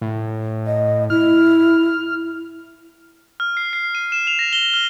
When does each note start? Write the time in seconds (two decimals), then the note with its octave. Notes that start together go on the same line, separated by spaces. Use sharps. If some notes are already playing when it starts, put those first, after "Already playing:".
0.01 A2
0.66 D#5
1.10 E4 F6
3.40 F6
3.57 C7
3.73 C7
3.95 D#7
4.12 E7
4.27 F7
4.39 A#6
4.53 G7
4.74 F6